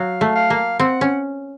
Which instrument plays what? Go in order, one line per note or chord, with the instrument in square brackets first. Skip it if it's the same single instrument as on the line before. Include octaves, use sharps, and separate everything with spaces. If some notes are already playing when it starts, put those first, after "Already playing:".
Already playing: [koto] F#3 [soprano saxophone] F5
[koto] A3
[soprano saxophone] F5
[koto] A#3
[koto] C4 [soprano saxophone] F#5
[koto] C#4